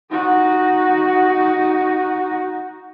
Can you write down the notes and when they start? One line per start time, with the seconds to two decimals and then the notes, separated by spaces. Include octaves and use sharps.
0.11 D#4 F#4